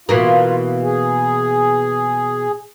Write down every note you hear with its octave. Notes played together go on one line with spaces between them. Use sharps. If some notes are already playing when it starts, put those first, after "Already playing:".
B2 E3 A#3 F4
G#4